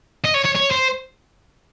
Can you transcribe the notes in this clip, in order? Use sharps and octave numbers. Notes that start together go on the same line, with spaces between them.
D#5
C#5
C#5
C#5
C5